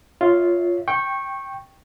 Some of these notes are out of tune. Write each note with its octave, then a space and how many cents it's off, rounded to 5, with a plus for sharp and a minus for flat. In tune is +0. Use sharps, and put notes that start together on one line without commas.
F4 +0 C#5 +10 E5 -35
G5 +0 C#6 -20